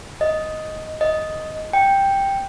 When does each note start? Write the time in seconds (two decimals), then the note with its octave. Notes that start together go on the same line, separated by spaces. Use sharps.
0.21 D#5
1.01 D#5
1.73 G5